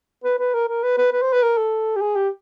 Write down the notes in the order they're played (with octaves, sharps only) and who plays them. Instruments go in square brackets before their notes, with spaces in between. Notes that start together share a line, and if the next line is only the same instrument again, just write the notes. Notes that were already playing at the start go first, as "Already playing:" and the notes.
[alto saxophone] B4
B4
A#4
A#4
B4
B4
B4
C5
B4
A#4
A4
G4
G#4
G4